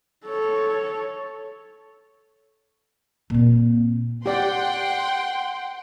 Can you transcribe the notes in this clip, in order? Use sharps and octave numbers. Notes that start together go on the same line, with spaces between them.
A4 C#5
A#2 C4
G4 D5 F#5 G5 C6